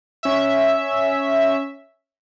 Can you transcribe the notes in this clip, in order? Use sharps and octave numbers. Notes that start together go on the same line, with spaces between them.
C#4 E5